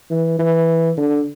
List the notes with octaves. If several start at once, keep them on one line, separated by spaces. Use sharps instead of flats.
E3
E3
D3